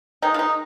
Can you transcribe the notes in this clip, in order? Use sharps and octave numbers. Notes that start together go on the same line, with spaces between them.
D#3 G#3 D#4
F4
D#4